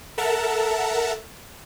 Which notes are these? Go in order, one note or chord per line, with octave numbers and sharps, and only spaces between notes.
A4 A#4 E5 F#5 A5 A#5